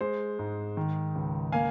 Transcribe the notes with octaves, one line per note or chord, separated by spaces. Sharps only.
G#3 C5
G#2
D#3
C#2
A#3 F5 G#5